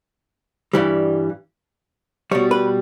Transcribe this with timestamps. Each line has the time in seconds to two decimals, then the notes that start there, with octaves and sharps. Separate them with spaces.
0.73 G2 E3 G3
2.31 B2 G3 C#5
2.51 B4